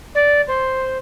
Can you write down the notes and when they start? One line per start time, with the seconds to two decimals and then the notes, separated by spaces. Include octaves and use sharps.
0.15 D5
0.47 C5